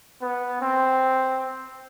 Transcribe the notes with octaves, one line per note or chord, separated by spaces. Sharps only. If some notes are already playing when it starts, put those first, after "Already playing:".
B3
C4